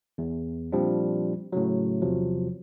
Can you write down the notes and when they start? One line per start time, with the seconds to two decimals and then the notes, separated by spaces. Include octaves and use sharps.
0.18 E2
0.72 A#2 F3 G3 C4 D4
1.52 A2 C#3 F#3
2.02 E2 C3 F3 F#3